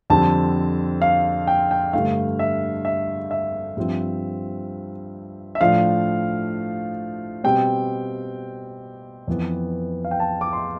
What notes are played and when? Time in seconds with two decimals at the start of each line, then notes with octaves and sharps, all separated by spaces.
0.10 F2 D3 G3 C4 A5
1.02 F5
1.47 G5
1.71 G5
1.93 G2 D3 A3 F5
2.39 E5
2.85 E5
3.31 E5
3.77 G2 F3 C4
5.55 E5
5.61 A2 F3 A3 D4 F5
7.44 B2 G3 C4 G5
9.27 F2 E3 B3
10.05 F5
10.11 G5
10.20 A5
10.41 D6
10.53 C6